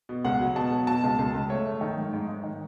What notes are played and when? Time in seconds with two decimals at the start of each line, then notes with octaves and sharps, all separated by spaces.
0.09 B2
0.24 C#2 F#5
0.41 F#3
0.56 B2 A5
0.72 F#3
0.87 B2 A5
1.03 C#2
1.19 C#2
1.35 C#2
1.50 A3 C#5
1.66 A3
1.81 D#3
1.97 G#2
2.13 G#2
2.29 G#2
2.44 D#3